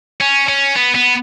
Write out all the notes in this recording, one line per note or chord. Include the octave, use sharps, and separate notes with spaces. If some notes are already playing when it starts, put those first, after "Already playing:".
C#4
C#4
B3
B3